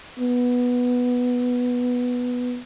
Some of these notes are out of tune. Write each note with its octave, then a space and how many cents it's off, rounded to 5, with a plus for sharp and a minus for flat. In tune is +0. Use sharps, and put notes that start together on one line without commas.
B3 -5